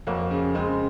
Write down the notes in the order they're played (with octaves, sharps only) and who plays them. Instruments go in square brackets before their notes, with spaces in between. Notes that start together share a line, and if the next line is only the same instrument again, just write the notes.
[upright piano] F2 [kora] F#3 A#3
[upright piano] C#3
[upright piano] C#3 [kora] G#3 C4